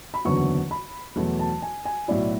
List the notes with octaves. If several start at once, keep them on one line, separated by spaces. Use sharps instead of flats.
B5
F#1 E2 D3 F#3 C#6
B5
E2 B2 F#3 A3
A5
G#5
G#5
B1 A2 F#3 B3 E4 D5